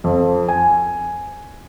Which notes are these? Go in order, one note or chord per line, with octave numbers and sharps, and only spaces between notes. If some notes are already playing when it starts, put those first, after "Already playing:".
F2
G#5